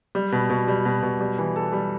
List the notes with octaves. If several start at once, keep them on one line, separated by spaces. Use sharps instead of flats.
G3
B2
B2
G3
B2
B2
G3
E3
A4
G3